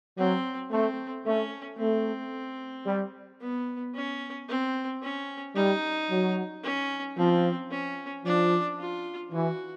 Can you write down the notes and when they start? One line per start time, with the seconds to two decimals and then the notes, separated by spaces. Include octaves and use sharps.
0.18 F#3 C4
0.72 A3 C4
1.25 A3 C#4
1.79 A3 C4
2.87 G3
3.41 B3
3.95 C#4
4.49 C4
5.02 C#4
5.55 G3 D#4
6.10 F#3
6.63 C#4
7.17 F3 C4
7.71 C#4
8.25 F3 D4
8.78 F4
9.32 E3 F#4